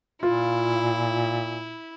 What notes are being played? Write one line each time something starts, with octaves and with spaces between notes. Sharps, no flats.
A#2 E4 F4